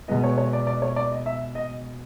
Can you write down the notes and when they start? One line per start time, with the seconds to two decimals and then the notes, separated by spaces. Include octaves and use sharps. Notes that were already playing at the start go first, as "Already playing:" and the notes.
0.08 B2 G#3 B3 D#5
0.24 C#5
0.38 C#5
0.53 D5
0.67 D5
0.82 C#5
0.96 D5
1.12 D#5
1.26 E5
1.55 D#5